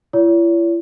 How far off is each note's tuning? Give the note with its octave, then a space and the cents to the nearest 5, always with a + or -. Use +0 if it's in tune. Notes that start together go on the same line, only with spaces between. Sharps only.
E4 +45 C#5 +45